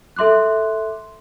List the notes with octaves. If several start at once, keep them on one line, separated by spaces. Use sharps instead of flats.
A4 E5 C6 D6 F#6